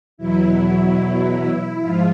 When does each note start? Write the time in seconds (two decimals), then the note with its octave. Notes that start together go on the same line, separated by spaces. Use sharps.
0.18 E2 B2 F#3 E4
1.81 G#2 F3 F4